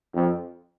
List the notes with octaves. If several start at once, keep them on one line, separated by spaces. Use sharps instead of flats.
F2